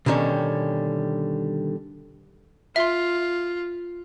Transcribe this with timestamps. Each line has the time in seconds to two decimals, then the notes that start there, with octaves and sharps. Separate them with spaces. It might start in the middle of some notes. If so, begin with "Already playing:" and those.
0.06 B2 D3 D#3 G3 C#4
2.76 F4 E5 C6